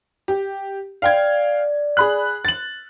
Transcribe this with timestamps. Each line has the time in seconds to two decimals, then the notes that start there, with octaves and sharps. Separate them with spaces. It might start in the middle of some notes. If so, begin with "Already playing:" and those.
0.28 G4
1.02 D5 F5 G5 G#6
1.97 G#4 B5 F#6
2.45 A6 F#7